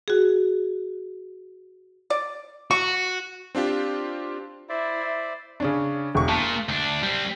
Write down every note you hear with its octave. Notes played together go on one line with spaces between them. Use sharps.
F#4 G#4
D5
F#4 C#6
C4 D4 F4 G4
E4 C5 D5 E5
C#3 C#4 D4
E1 C#6
A#2 A5
D2 D4
G3 C4